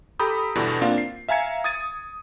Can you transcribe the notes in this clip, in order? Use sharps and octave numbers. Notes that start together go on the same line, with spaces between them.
G4 A4 A#5 B5 D#6 G6
E2 G2 B2 D3 E3
A#3 C4 D4 F4 F5
C7
E5 F5 G#5 A#5 G#6 C#7
D#6 G#6 A6 D#7